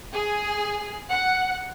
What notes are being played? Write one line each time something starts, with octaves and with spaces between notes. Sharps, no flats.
G#4
F#5